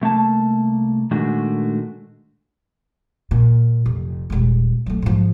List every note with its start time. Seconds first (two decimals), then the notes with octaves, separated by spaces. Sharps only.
0.02 C2 A3 A#3 A5
1.11 A#2 D#3 G#3 A3 D4 F#4
3.31 A#2
3.86 F1
4.30 D#1 G#3
4.86 F#3 A3
5.02 G#2 F3